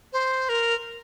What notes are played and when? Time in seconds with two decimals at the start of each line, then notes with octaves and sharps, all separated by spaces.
0.13 C5
0.49 A#4